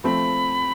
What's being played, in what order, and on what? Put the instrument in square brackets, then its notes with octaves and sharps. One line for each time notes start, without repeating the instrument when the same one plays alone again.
[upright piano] F3 A3 C4 [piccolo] B5